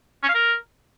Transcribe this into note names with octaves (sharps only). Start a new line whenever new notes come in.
C#4
F5
A#4